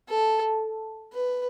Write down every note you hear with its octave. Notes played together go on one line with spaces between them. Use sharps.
A4
B4